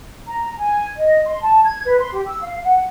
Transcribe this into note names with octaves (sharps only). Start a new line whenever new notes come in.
A#5
G#5
D#5
C6
A5
G#6
B4
C6
G4
E6
F5
F#5